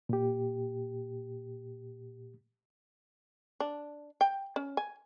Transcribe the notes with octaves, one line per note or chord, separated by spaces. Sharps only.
A#2 G4
D4
G5
C#4
G#5